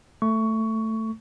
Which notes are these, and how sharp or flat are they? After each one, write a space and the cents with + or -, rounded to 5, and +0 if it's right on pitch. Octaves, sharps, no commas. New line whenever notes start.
A3 +5 C#6 +15